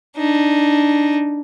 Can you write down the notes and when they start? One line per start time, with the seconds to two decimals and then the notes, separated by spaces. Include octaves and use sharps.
0.17 D4 D#4